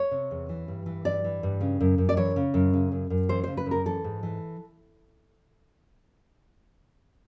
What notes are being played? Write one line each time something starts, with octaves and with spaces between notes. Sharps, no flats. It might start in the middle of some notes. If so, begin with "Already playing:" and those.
Already playing: C#5
C3
E2
E3
G2
E3
G2 D5
E3
G2
C#3
F#2
F#2
D5
E3 C#5
C#3
F#2
C#3
F#2
F#2
E3 C5
C#3 C5
B4
F#2
A#4
E3 A4
G#2
E3